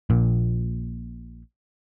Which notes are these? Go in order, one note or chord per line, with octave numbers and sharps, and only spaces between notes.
A#1 A#2